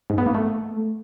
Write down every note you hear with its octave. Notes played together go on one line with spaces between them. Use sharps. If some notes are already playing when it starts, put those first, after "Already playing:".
G#2
B3
A#3
A3